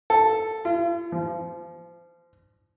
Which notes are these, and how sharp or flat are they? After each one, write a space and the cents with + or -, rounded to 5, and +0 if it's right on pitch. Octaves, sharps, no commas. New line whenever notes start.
A4 +0
F4 -45
F3 -25